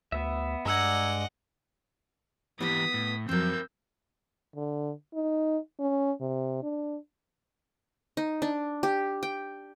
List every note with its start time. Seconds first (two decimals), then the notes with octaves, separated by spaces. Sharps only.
0.12 D2 B3 E5
0.65 G2 G#3 D5 D#5 F#5 A#5 E6 G#6
2.60 E3 B3 E4 G4 D#5 D#6 B6
2.94 A2
3.29 F2 F#3 C4 A#4 E6 G6
4.56 D3
5.14 D#4
5.80 C#4
6.21 C3
6.63 D4
8.17 D#4
8.42 D4
8.83 G4
9.23 G5